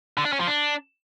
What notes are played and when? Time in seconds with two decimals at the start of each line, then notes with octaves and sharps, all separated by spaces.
0.18 D3
0.25 D4
0.32 C#4
0.40 F3
0.47 D4